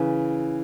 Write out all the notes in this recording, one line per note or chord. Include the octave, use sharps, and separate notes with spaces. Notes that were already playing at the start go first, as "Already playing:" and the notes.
Already playing: C#3 E3